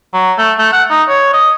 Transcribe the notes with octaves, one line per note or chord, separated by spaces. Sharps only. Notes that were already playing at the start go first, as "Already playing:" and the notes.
F#3
A3
A3
F#5
D#4
C#5
D#5